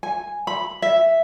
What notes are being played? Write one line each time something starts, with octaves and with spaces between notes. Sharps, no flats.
G#5
B5
E5